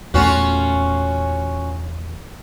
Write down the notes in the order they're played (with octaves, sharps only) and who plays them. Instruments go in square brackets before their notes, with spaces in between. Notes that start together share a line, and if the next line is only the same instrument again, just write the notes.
[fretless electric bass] E2 A#2 A3 [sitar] C#4 F4 F#4